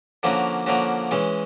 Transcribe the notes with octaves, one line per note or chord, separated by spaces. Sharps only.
D3 F3 A#3 C#4 F#4
D3 F3 A#3 C#4 F#4
E3 G#3 C#4